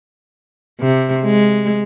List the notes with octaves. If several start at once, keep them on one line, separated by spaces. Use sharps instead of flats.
C3
G#3